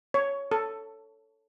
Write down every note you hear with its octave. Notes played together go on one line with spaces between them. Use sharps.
C#5
A4